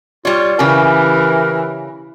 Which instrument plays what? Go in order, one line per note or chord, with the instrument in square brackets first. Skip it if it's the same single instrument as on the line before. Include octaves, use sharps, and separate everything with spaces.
[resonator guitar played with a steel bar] G3 C#5 [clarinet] F4
[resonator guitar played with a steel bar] C#3 G4 [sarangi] E3 [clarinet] A#4